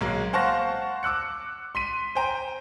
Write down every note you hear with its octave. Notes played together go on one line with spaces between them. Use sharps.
B1 G#3 A#3
C5 F5 F#5 A5 C#6 A#6
D6 E6 F#6 C#7
C6 B6 D#7
C5 G5 A#5